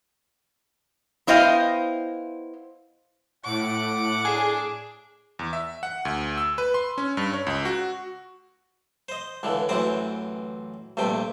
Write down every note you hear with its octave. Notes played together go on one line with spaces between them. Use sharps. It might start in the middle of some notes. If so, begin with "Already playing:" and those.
B3 E4 C5 D#5 F5 G5
A2 F#5 D6
D4 G#4
E2
E5
F#5
D2
E6
B4
C6
C#4
G2
C#5
C#2
F#4
C5 D#5
C#2 D3 E3
A1 F#2 E3 C4 C5 G5
A#1 G2 C3 A3 G5